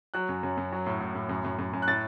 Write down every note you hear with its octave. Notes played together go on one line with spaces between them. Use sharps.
F#3 F#6
F#2
F#2
F#2
F#3
A2
A2
A2
F#2
F#2
F#2
F#2
F#6
A2 A6